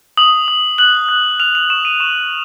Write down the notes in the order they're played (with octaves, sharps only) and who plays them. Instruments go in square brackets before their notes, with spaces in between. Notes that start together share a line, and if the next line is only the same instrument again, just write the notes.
[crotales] D#6 F#7
D#6
F#6 F#7
F#6
F6 F7
F7
C#6 E7
D#7
C#6 E7